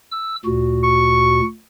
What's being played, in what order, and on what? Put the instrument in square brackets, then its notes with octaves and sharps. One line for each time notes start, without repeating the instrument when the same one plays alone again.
[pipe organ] E6
D2 A#2 F#4
[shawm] C#6